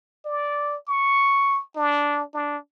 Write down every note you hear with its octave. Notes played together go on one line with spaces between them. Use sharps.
D5
C#6
D4
D4